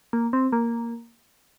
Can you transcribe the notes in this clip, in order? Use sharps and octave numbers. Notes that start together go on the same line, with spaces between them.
A#3
C4
A#3